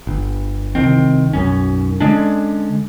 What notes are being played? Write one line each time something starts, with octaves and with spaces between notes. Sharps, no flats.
G1
C2 D#3 C4
B1 F#2 C#4
D3 G#3 C#4 D4